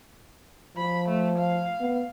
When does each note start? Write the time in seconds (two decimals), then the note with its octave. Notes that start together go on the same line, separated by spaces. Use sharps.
0.77 F3 B5
1.09 A3
1.38 F5
1.81 B3